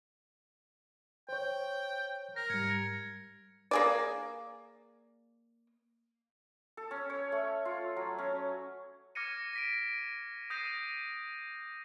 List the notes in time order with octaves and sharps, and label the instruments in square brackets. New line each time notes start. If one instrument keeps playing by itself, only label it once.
[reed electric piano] C5 C#5 [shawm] G5
[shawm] A#4 [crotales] A#6
[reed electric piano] G#2 G3 [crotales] G#6 C#7
[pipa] A#3 G#4 D5
[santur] A4
C#4
C#5
A3
F4
F#3
C#4
[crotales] D6 F6 G#6 A#6 C#7 D#7
A#6 B6 D7
D#6 G6 A#6 C7 D#7